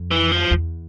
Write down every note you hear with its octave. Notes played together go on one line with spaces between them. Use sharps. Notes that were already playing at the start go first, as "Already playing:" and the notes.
Already playing: F2
E3
F3
E2